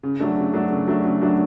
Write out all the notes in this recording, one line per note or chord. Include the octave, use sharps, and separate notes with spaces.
C#3
F#3 A3 D4
C#3
F#3 A3 D4
C#3
F#3 A3 D4
C#3
F#3 A3 D4